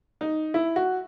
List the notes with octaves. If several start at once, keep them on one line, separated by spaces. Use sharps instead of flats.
D#4
E4
F#4